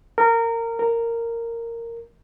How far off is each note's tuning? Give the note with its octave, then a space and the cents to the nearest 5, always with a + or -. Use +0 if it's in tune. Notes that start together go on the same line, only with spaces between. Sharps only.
A#4 -20
A#4 -10